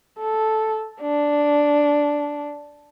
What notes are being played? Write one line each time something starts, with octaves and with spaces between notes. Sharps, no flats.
A4
D4